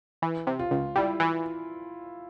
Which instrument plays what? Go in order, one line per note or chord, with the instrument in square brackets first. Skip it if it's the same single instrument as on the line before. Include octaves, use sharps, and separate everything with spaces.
[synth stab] E3
C3
[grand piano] F4
[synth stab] C#2
[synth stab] G3 [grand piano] E4
[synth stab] E3